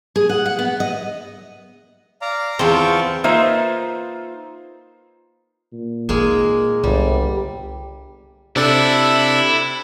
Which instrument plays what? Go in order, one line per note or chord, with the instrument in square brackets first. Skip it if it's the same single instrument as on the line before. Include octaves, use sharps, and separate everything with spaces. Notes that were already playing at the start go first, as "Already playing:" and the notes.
[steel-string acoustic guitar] G#4
F#5
F#5
B3
D#5
[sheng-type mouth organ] D5 F5 A#5
[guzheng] E2 C4 [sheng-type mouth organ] F4 A5 C#6
[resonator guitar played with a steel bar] A#3 D#4 F4 B4 C5 E5
[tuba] A#2
[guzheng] G#3 A#3 G#4 [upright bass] C4 D#4
[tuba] G1 [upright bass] C2 [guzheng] G3
[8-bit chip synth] C3 D4 A4 [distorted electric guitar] E4